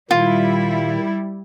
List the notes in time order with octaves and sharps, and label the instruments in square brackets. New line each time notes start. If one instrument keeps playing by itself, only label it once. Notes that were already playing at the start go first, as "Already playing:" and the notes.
[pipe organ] A#2 D#3 [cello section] G3 E4 [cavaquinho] F4